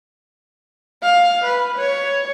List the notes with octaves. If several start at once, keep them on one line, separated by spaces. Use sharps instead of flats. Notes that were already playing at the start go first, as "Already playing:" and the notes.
F5
B4
C#5